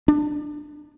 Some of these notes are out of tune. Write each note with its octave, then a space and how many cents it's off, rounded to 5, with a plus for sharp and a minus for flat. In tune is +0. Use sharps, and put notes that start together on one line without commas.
D4 +20